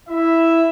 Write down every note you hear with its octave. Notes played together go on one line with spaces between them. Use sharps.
E4 E5